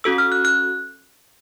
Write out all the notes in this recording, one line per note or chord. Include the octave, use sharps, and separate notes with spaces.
C#4 F#4 A4 E6
F6
F#6
F#6